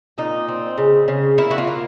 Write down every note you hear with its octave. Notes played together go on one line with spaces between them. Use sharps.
A#2 D#4
C4
C#3
C#3
A#3 E4
F#4
F4
A#3